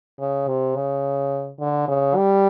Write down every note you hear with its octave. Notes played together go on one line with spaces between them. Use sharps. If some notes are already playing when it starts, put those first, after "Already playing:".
C#3
C3
C#3
D3
C#3
G3